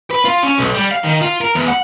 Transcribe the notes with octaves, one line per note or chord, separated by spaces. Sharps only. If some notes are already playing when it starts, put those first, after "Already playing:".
B4
F4
C#4
B1
G3
F5
D#3
F4
A#4
E2
F#5